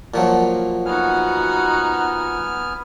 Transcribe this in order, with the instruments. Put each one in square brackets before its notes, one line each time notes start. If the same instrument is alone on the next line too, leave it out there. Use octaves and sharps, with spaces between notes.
[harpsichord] A#2 F3 F#3
[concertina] B3 G#5 F6 [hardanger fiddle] D#4 F#4